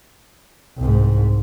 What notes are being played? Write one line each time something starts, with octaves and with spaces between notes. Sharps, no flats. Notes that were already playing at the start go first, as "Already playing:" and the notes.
C2 G#2